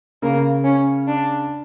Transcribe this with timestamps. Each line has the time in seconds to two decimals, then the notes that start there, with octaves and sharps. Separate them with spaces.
0.22 C#3 A#3
0.64 C#4
1.08 D4